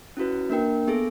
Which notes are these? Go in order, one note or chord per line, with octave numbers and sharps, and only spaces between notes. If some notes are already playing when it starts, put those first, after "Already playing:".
C#4 E4 F#4 B4
A#3 D4 A#4 G5
B3 G#4 A4 A#6